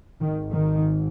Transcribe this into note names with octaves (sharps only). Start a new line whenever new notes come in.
G#1 G#2 D#3
D#3